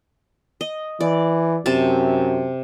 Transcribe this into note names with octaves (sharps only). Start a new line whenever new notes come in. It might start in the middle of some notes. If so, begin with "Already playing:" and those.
D#5
E3 D5
F#2 C3 C4 A5